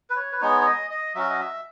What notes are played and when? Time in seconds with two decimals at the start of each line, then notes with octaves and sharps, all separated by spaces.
0.10 B4
0.16 C#5
0.32 B4
0.41 G#3 B3 D#4 C#5
0.61 C#5
0.66 D#5
0.91 D#5
1.15 F#3 C#4 F#4 E5
1.29 D#5
1.40 E5